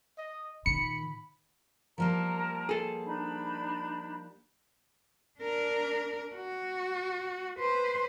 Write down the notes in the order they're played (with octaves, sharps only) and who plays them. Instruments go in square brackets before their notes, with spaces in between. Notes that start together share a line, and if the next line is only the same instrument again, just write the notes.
[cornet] D#5
[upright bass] A#2 D#3 [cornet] B5 [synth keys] C#7
[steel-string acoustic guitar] F3 G3 A#3 [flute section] A#4 A5 A#5
[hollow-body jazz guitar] G#4 A4
[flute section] D4 D#4 B5
[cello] D4 A#4
F#4
B4 C5